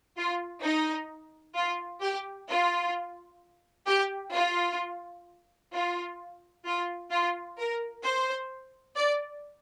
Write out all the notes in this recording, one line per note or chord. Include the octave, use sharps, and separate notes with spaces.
F4
D#4
F4
G4
F4
G4
F4
F4
F4
F4
A#4
C5
D5